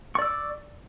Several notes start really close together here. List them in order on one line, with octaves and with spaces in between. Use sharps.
C#6 D5 E6 D6